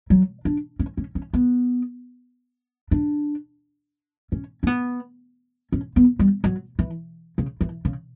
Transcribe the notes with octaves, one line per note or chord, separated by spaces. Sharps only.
F#3
D4
C#4
C#4
C#4
B3
D4
C#4
C#4
B3
C#4
B3
G3
F#3
E3
C#3
E3
C#3